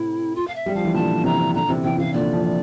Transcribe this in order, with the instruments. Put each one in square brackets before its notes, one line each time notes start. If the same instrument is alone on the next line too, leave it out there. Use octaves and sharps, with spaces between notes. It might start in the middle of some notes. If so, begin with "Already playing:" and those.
Already playing: [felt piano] A2 C3 [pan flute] E4
[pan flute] F4
F5
E5
[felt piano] G3
[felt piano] F3 [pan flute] F5
[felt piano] E3
[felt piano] A#2 D3 [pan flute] A5
[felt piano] C3 E3 [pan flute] A#5
[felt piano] A#2 D3 [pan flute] A#5
[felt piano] C3 E3
[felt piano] C3 E3 [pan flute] G5
[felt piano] C3 E3 [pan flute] F5
[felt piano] A#2 D3 [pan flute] D5
[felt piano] D3 F3